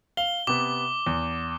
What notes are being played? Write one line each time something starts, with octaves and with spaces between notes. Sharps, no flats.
F5 G7
C3 B3 D6
E2